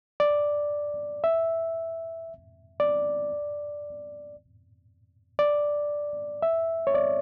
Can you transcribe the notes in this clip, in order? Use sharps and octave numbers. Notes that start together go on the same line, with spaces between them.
D5
E5
D5
D5
E5
C#5
D5